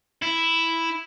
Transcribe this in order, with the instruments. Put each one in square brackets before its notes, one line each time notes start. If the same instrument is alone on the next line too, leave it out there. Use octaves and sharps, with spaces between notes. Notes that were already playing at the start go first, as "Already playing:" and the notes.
[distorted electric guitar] E4